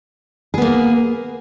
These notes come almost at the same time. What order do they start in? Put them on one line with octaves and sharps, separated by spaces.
G#4 B3 A#3